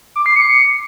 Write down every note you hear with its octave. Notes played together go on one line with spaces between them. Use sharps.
D6
C7
C#7